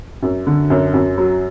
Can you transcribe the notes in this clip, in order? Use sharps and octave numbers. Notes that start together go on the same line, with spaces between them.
F#2
D3
F#2
F#2
F#3